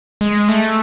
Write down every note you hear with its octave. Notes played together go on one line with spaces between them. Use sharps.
G#3
A3